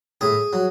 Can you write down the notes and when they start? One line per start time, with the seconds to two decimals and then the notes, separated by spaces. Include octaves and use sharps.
0.21 A2 G#4
0.53 F#3